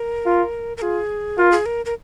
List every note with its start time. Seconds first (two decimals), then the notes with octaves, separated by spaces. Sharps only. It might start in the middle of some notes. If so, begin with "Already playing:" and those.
Already playing: A#4
0.26 F4
0.77 A#4
0.82 F4 G#4
1.38 F4 A#4
1.52 G#4
1.66 A#4
1.86 A#4